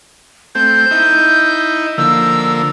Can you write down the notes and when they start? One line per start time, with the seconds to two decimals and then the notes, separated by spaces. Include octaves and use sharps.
0.55 A3 C4 G6
0.91 D#4 E4
1.98 D3 F3 A#3 E6